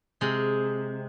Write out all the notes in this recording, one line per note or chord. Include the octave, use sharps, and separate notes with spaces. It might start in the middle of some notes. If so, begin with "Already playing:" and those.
C3 G#3